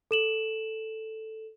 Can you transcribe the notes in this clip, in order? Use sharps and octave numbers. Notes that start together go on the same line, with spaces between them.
A4 E7 F#7